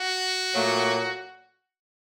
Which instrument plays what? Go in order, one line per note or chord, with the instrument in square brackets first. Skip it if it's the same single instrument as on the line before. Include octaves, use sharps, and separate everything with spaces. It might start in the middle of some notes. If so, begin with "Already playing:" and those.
Already playing: [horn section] F#4
A#2 F#3 A3